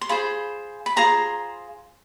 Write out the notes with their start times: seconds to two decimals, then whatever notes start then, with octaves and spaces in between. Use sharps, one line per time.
0.01 C6
0.09 F4 G#4 C5 B5
0.86 B5
0.96 F4 G#4 C5 A#5